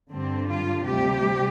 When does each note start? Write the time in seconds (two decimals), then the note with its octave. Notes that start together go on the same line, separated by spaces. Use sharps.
0.11 G2 D3 G3 C4
0.50 F4
0.86 D2 C3 G3 G4